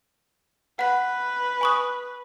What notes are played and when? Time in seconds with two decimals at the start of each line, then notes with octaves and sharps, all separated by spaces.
0.79 B4 F#5 B6
1.61 G#5 C#6 D#6